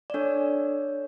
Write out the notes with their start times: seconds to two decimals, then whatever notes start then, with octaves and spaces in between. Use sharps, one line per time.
0.10 D5
0.14 D4 A4 C#5